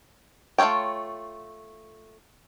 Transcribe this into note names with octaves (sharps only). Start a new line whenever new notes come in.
A3 F4 A4 C#5 G5